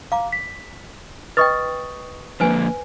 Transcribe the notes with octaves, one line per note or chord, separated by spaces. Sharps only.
F5 A#5 D6
B6
B4 D#5 G5 C#6 D#6 A6
D3 F3 A#3 B4 C5 G#5